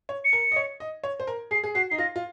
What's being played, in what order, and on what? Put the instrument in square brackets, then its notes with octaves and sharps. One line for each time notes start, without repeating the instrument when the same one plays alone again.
[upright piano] C#5
[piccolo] C#7
[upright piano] A#4
D#5
C#5
D#5
C#5
C5
A#4
[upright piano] G#4 [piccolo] C7
[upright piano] G#4
[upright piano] F#4 [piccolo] C7
[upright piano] D#4 [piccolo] C7
[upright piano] F4 [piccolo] A#6
[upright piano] F4